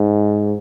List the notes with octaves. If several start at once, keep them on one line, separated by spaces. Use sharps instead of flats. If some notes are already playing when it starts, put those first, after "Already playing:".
Already playing: G#2